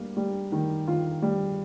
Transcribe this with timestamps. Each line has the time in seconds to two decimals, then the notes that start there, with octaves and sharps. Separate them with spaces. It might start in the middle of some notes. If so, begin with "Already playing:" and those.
Already playing: G3 A#3
0.17 G3
0.52 D#3
0.87 D#3 F4
1.22 G3